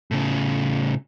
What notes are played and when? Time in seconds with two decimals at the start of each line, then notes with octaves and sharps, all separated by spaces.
0.11 A2 C#3